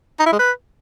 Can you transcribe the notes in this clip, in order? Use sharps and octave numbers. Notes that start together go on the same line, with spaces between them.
D#4
E4
G#3
B4